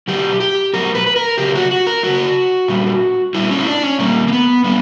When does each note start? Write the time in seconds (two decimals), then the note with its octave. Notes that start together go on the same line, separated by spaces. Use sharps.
0.08 B2 F#3 G4
0.40 G4
0.73 B2 F#3 A#4
0.95 B4
1.07 B4
1.16 A#4
1.38 C#3 F#3 G4
1.55 F#4
1.71 F#4
1.87 A#4
2.03 C#3 F#3 F#4
2.68 A#2 G3
3.34 A#2 G3 E4
3.51 C#4
3.59 E4
3.67 D4
3.83 C#4
3.99 A#2 G3 A#3
4.28 A#3
4.32 B3
4.64 A#2 G3 B3